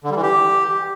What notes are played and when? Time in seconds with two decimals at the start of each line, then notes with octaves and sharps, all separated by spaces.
0.04 D3
0.10 G3
0.16 E3
0.22 G4